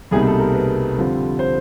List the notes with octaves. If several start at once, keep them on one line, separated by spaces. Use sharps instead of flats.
C2 B2 G3 A#3 D#4 G#4
A4
A#4
B4
F2 D3 G3 C4 F4
C5